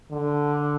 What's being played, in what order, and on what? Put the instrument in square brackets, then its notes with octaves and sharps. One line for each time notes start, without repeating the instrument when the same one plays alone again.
[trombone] D3